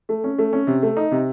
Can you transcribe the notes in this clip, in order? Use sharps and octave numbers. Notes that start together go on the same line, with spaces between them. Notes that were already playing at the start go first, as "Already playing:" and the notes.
A3
C#4
A3
C#4
C3
A3
D#4
C3